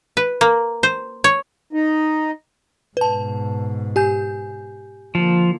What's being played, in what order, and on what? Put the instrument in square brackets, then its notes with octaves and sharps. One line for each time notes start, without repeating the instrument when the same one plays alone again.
[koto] B4
A#3
C5
C#5
[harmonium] D#4
[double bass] G#2 B2 [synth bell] B4 A5
[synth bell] G4 G#5 G6
[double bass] D3 A#3 [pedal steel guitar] F3